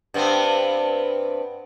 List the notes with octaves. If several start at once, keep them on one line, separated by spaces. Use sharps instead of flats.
G2 B3 C4